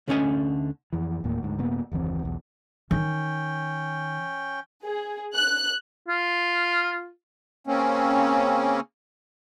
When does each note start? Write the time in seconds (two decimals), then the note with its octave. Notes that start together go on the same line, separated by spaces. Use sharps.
0.08 D2 D3 A3 C#4 D#5 G#5
0.93 F2 E3
1.24 D1 D#2 A2 A#3
1.43 D2 G#2
1.59 D#1 A#2 A#3 B3
1.92 F#1 D#2 E3 C4
2.23 B1 E2
2.91 D#3 C#4 G5
4.84 G#4
5.35 F#6
6.08 F4
7.67 C#3 A#3 C4 C#4